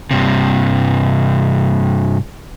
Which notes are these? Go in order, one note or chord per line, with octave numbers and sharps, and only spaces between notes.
G2 C3